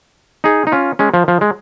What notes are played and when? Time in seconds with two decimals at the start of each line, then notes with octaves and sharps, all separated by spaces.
0.44 D#4 G#4
0.67 D#4
0.72 C#4 F4
0.99 G#3 C#4
1.14 F3
1.28 F3
1.41 G#3